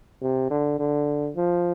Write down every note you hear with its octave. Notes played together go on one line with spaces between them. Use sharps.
C3
D3
D3
F3